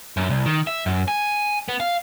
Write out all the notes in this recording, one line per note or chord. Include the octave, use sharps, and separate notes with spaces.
F#2
C2
D#3
E5
F#2
G#5
B3
F5